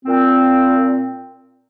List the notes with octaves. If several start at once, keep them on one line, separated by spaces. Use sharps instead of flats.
A#2 C4